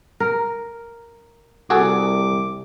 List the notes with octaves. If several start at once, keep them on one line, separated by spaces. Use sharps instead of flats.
A#4
C2 F#4 G#4 A4 D6